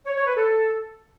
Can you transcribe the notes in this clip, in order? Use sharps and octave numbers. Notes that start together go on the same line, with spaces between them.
C#5
C#5
B4
A4